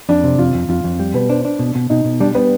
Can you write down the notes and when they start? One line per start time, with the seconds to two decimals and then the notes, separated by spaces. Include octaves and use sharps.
0.09 F2 D4
0.24 C3
0.39 F2 F4
0.54 F2
0.69 F2 F4
0.84 F2
0.99 G3
1.14 B2 B4
1.29 D4 C5
1.45 D4
1.59 B2
1.75 B2
1.90 B2 D#4
2.05 B2
2.20 G3 D4
2.35 G3 B3